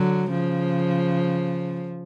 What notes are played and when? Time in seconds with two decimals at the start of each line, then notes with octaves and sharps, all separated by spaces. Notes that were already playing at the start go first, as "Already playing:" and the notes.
Already playing: D3 F#3
0.31 C#3 F3